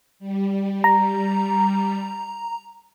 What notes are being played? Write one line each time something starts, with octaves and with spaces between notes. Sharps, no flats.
G3
A#5